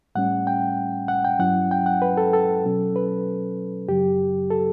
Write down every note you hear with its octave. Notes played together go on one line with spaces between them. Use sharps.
A2 G3 C#4 F#5
G5
F#5
G5
G2 F#3 C#4 E4 F#5
G5
F#5
B4
A4
A4
B2 F#3 C#4
B4
F#2 C#3 F#3 G4
A4